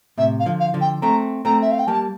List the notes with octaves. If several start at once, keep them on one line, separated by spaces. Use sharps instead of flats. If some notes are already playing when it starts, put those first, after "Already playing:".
A2 C3 E5
F5
D3 F3
F5
D3 F3
G5
A3 C4 A#5
A3 C4 A#5
E5
F5
G5
G3 A#3 A5